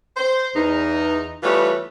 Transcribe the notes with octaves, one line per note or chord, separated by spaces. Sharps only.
C5
E2 D#4
E3 G3 A3 B3 F4 C#5